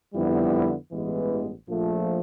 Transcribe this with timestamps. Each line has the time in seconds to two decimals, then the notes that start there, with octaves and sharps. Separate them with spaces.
0.14 F2 D3 G3 B3 E4
0.91 A1 G2 E3 G#3 B3
1.67 A#1 A#2 F3 A3